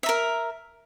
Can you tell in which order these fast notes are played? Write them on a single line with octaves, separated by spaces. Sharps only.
E5 A#5 A#4